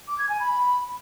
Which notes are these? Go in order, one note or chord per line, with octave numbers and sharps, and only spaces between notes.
D6
G#6
G#5
B5